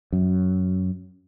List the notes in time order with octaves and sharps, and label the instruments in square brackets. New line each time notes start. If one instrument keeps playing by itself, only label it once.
[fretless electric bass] F#2